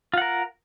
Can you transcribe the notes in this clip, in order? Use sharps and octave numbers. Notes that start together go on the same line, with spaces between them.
F4 A#4 F#5